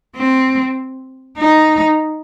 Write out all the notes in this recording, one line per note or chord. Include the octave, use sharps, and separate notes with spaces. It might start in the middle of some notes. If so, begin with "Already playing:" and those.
C4
D#4